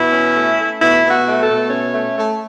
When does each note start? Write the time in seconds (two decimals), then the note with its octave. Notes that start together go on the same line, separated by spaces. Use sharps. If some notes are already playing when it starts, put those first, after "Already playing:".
Already playing: B2 E4
0.12 C#4
0.34 A3
0.58 A3
0.80 B2 E4
1.03 B2
1.11 F#4
1.26 A3
1.41 A4
1.48 B2
1.70 C#4
1.94 A3
2.17 A3